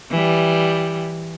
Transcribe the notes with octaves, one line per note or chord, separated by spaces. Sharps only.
E3 G3